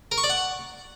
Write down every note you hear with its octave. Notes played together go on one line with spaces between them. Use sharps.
A#4
C#6
D5
F#5